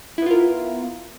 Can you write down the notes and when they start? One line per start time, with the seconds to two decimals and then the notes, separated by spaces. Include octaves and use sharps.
0.18 E4
0.22 B3
0.26 F4
0.31 A#4